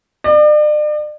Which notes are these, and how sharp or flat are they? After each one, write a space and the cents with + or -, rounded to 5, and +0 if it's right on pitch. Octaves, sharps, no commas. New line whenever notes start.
D5 +40